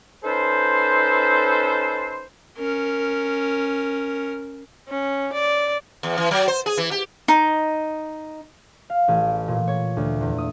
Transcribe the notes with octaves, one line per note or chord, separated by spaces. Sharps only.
C#4 D#4 A4 B4 C5
C#4 A#4
C#4
D5
E2
E3
F#3
C5
G#4
E3
G4
D#4
F5
A1
A#2
C#5
D2
E2
D#6